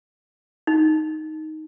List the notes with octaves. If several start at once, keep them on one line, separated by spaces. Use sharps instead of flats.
D#4